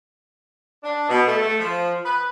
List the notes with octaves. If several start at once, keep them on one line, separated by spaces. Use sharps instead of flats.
D4
B2
A3
A3
F3
B4